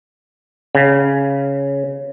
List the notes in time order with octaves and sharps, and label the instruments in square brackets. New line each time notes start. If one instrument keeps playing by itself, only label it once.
[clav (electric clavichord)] C#3